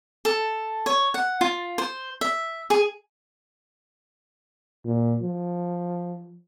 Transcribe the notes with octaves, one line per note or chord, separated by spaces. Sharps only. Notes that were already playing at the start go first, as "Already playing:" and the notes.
A4
C#5
F#5
F4
C5
E5
G#4
A#2
F3